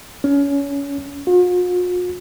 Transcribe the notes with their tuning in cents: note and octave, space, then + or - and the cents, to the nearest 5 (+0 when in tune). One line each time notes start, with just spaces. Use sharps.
C#4 +25
F4 +45